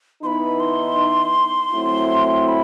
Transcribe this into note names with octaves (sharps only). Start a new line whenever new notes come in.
E3 B3 D#4 B5 C6
C6
F#3 A3 C4 E4
B5